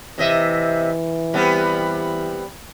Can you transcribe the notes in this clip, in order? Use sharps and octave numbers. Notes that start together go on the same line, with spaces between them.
C3 E3 D#5 E5
G3 B3 C4